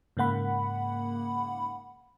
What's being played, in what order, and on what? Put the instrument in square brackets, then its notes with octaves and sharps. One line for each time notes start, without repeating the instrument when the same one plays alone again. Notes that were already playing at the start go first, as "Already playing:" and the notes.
[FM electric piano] G#2 C#3 A#3 F#5 B5